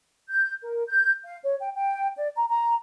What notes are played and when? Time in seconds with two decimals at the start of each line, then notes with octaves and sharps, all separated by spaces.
0.30 G6
0.63 A#4
0.87 G6
1.25 F5
1.43 C#5
1.59 G5
1.75 G5
2.17 D5
2.36 A#5
2.49 A#5